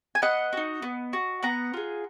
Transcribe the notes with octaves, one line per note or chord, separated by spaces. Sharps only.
G#5
B3 D#5 F#5
D#4 F#4
B3
F#4
B3 F#5 A#5
F4 G#4